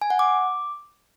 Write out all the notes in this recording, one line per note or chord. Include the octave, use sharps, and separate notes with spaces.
G#5
F#5
D6